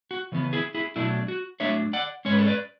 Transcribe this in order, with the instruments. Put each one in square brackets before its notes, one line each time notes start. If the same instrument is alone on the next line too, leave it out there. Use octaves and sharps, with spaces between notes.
[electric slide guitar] F#4
C#3 E3 B3
E4 G#4
E4 G#4
B2 F#3 A3 D4 E4
F#4
A2 F#3 A3 D4 C#5 E5
D5 F#5
G#2 G#3 C#4 C#5
B4
A4 C#5
B4 D5